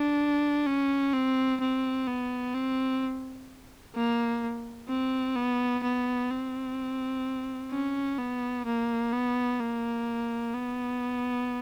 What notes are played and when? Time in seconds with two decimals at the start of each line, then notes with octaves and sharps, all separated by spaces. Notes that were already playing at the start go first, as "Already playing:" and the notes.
Already playing: D4
0.67 C#4
1.13 C4
1.60 C4
2.07 B3
2.55 C4
3.95 A#3
4.89 C4
5.36 B3
5.83 B3
6.31 C4
7.71 C#4
8.18 B3
8.66 A#3
9.13 B3
9.60 A#3
10.54 B3